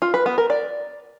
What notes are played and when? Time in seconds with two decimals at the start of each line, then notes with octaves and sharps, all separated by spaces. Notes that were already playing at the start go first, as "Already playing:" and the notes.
0.02 F4
0.14 B4
0.26 B3
0.38 A#4
0.50 D5